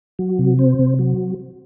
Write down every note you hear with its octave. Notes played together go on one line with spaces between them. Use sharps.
F#3
C3
C4
C3
F#3